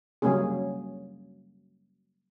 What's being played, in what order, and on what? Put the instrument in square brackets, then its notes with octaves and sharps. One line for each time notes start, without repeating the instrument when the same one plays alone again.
[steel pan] C#3 F#3 G3 A#3 C#4 G#4